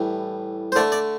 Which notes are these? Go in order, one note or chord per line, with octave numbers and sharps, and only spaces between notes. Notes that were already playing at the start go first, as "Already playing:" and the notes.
Already playing: A2 E3 G3
C5
D3 A3 D5
D5